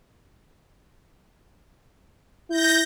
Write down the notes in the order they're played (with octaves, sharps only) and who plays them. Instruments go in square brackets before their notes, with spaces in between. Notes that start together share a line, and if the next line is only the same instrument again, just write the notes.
[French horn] E4 [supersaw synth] G6 A#6